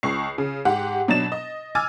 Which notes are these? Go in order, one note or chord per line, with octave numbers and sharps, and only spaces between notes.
C#2 C#6 C7
C#3
G#2 G4 F#5
B2 F#3 D4 D#4 A6 E7
D#5
G#5 D6 E6 F6 G#6 A6